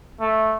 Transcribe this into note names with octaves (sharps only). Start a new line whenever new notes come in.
A3